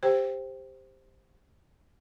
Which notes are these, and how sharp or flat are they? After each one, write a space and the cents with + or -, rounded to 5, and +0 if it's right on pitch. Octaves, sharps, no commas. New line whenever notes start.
G4 +15 C5 +0 G5 +0